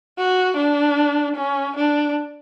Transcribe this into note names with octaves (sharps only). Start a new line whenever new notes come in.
F#4
D4
C#4
D4